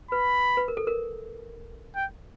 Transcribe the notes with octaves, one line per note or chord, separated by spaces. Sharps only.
B4 B5
B4
A#4
A4
A#4
G5